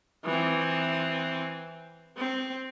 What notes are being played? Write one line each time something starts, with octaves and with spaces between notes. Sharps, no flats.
E3 C4
C4